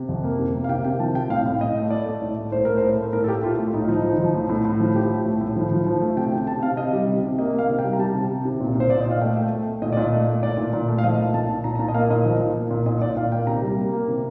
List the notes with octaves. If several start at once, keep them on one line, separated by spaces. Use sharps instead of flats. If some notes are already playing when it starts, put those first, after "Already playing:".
Already playing: C3
F2
A#3
C3
A#3
F5
C3 G5
C3 G5
F3 A5
C3 G5
A2 F5
A2
A2 D#5
A3
A3 D5
A3
A2
A3
A2 C5
A3 A#4
A2 C5
A3
A2 A#4
A4
A3 G4
A2 F4
A3
A2 D#4
F4
F3 D#4
F3
F3
A2
A2
A2
F3
F3 G4
A3
A2
A2
F3
F3
F3
A3
C3 G5
C3 G5
C3 A5
C3 F5
C3 D#5
G3
C3
C3
A#3 D#5
A#3 F5
C3
G5
G3
A#5
G3 A5
C3
C3
C3
A#2
A#2 C5
A#2 D5
D#5
A#2
F5
A3 G5
A3
A3
A3
A#2 D#5
A#2 D5
D#5
A3
A3
A#2 D5
A#2
A#2
A3
F5
F3 D#5
A#2
A#2 A5
A#2
A#2 A#5
A#5
A#2 A5
D#5
A#3 F5
A#2 D#5
F3
A#2
A#3
A#2
A#2 D#5
A#2 D5
A#2 F5
A#3 G5
C3 A#5
G3
A#3
A#3
C3